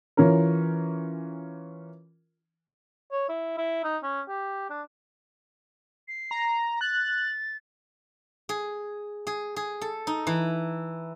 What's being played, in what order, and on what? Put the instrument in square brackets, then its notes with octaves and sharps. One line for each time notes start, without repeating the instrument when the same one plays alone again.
[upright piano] E3 C#4 F4 A#4
[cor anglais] C#5
E4
E4
D#4
C#4
G4
D4
[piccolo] C7
[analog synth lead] A#5
[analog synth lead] F#6 [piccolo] A6
[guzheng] G#4
G#4
G#4
A4
D#4
E3